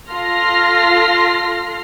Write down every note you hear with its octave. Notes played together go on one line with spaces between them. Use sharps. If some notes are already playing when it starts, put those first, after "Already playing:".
F4 A4 C6 F6 A#6 C7